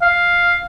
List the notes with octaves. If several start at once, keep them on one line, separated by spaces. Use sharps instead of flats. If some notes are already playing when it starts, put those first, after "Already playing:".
F5